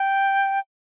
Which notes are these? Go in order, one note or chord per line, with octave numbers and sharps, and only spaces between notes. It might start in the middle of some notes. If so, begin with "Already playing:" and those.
Already playing: G5